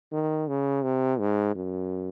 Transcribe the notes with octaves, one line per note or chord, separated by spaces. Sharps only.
D#3
C#3
C3
G#2
F#2